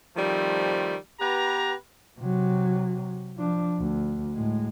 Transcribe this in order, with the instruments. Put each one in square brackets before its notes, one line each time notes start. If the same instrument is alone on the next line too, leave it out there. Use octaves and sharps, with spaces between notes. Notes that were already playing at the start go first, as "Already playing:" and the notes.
[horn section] D#3 F3 G3 A3 C4
B3 G4 B4 A#5
[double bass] C3 F#3
F3 D4
D2
A2 G#3